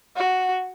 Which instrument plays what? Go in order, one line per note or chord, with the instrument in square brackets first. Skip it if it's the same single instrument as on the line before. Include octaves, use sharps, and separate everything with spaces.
[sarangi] F#4